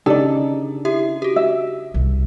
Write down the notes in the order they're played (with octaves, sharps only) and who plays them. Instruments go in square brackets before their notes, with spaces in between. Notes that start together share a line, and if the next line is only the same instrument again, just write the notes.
[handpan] C#3 D4 D#4 [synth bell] G4 [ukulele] A4 D5
[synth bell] E4 G4 E5
F#4 G4
[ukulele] E5
[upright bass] C2